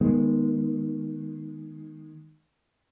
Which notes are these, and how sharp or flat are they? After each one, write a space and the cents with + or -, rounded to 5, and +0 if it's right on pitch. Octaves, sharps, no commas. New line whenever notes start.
D#3 +0 G#3 -5 B3 -25